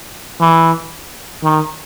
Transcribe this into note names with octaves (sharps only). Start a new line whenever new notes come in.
E3
D#3